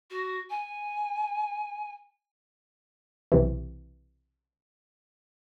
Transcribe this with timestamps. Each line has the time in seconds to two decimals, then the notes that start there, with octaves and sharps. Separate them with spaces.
0.10 F#4
0.50 G#5
3.32 B1 C3 E3